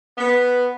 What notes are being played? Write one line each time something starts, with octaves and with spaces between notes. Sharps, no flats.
B3